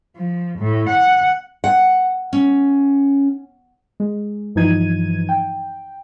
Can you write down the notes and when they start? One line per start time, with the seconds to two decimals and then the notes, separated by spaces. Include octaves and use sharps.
0.16 F3
0.59 A2
0.89 F#5
1.64 F#5
2.33 C#4
4.00 G#3
4.55 G2 E3 F3 D#4 G#6 D#7
5.29 G5